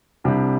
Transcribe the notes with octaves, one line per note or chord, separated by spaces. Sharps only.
C2 C3 G3 D4 G4